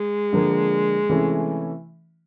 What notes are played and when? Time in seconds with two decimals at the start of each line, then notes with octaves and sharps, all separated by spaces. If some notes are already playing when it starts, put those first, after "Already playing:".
Already playing: G#3
0.33 D3 F3 A#3
1.09 C3 E3 A3 C#4 E4